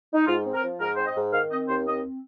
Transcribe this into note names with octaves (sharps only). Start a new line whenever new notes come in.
D#4
G#2 F4
C4
A#4
F3
G#2 A#4
C4 C5
D#5
G#2
D#3 F5
C4 D#5
D#2 C5
C4 D#5